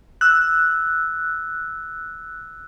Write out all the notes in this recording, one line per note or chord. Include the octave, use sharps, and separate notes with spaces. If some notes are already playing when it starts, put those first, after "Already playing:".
E6 F#6